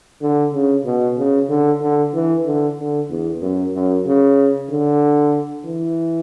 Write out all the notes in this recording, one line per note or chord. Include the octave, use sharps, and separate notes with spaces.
D3
C#3
B2
C#3
D3
D3
E3
D3
D3
E2
F#2
F#2
C#3
D3
E3